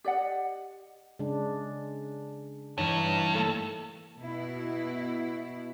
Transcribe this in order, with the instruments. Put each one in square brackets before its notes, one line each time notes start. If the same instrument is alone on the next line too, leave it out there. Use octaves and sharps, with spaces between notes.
[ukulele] G4 D5 D#5 F#5
[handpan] C#3 G#3 D4
[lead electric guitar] G2 [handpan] E3 D#4 C#5
[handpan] A3 A#3 A4
[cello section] B2 E4